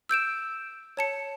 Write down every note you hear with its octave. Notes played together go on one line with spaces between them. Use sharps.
E6 G6 D7 E7
C#5 A5 C#7